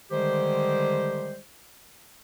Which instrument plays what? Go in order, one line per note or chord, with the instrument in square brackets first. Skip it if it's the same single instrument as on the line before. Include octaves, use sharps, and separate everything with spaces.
[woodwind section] D3 D#3 G3 G#3 G4 C5